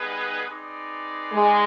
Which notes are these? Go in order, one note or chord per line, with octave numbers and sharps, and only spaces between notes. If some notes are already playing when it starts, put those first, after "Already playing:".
Already playing: G3 B3 D#4 G#4 B4
C4 D#4 G#4 B4 D5
G#3